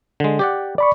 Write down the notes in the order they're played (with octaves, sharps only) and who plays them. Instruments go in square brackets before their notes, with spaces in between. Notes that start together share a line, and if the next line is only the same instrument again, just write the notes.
[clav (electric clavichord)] D3 G#3
G4 D5 F#5
[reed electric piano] D5 B5 C#6